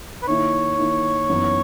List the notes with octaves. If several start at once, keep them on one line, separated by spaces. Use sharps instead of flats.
B4
D#3 A#3 E4 C#5
D#3 A#3 E4
F#2 E3 B3 D#4